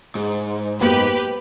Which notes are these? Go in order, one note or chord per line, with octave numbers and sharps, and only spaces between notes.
G#2
F#2 A#3 B3 G4 B4